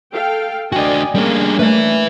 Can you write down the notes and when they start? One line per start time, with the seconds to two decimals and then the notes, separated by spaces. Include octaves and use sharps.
0.13 A4 F5 G5
0.72 D4 F#4 D5 D#5 G5 G#5
1.15 G3 A#3 C#4 D4 G#4
1.59 A3 B4 E5